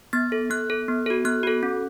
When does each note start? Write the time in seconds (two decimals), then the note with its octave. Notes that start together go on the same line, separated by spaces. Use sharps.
0.13 B3 A6
0.32 A4
0.50 B3 F#6
0.70 A4
0.88 B3
1.06 F#4 A4
1.25 B3 F#6
1.43 F#4 A4
1.63 C#4